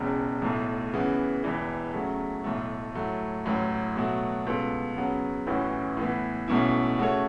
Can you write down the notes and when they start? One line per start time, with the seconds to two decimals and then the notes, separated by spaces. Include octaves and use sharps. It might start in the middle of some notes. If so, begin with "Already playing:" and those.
Already playing: E1 E2 C#3
0.42 B1 A2 A3
0.94 C#3 E3 B3
1.44 E1 E2 E3
1.93 C#3 F#3 A3
2.44 B1 A2 A3
2.95 A2 F#3 A3
3.46 A1 A2 F#3
3.96 B2 F#3 A3 F#4
4.46 C#2 B2 B3 A4
4.97 C#3 F#3 B3
5.47 A1 A2 E3 C#4 F#4
5.97 A2 E3 B3
6.48 B1 B2 A3 C#4 E4
6.98 C#3 A3 F#4 A4 C#5